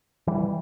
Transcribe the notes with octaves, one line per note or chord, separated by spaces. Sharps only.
E3 G3